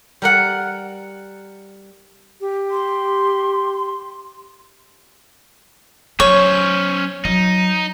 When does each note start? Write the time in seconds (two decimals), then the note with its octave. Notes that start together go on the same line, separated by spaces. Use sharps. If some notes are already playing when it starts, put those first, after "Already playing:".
0.22 G3 A#4 F#5
2.41 G4
2.71 C6
6.20 F#3 C#4 C5 C#5
7.25 F#3 D#4